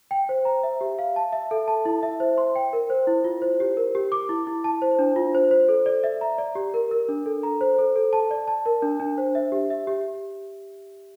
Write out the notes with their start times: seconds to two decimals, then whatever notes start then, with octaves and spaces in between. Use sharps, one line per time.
0.11 G5
0.29 C5
0.45 A#5
0.63 E5
0.81 G4
0.99 F5
1.16 A5
1.32 E5
1.51 A4
1.68 A5
1.85 E4
2.03 E5
2.20 C5
2.38 C6
2.56 G5
2.73 A#4
2.90 C5
3.07 E4
3.24 F4
3.42 C5
3.60 G4
3.77 A#4
3.95 G4
4.12 D6
4.29 E4
4.47 E4
4.64 A5
4.82 C5
4.99 D4
5.16 F4
5.35 C5
5.51 C5
5.69 A4
5.86 D5
6.04 E5
6.21 A#5
6.38 D5
6.55 G4
6.74 A#4
6.91 A#4
7.09 D4
7.26 A4
7.43 A#5
7.61 C5
7.79 A4
7.96 A4
8.13 A5
8.31 D5
8.48 A5
8.66 A#4
8.82 D4
9.00 D4
9.18 C5
9.35 E5
9.52 G4
9.70 E5
9.87 G4